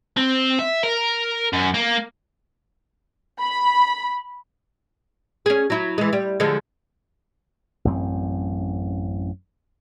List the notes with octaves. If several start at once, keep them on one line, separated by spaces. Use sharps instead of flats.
C4
E5
A#4
F#2
A#3
B5
C#4 G#4
F#3 E4
E3 G#3
G3
D3 F3 G#3
A1 F#2 C4